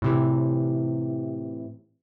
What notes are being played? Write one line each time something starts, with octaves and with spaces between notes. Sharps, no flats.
A2 C3 E3